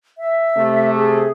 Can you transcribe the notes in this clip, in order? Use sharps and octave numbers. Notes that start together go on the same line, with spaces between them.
E5
C3 A3
G#4